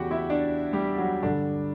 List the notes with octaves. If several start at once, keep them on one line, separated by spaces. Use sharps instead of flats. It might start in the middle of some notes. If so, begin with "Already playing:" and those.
Already playing: E2 C#3 E3 F#4 G4 F#5 G5
E4 E5
D4 D5
G3 G4
F#3 F#4
G2 D3 D4